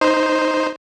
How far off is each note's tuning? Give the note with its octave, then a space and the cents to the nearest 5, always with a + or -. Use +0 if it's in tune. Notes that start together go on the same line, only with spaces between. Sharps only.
D#4 +0 C5 +0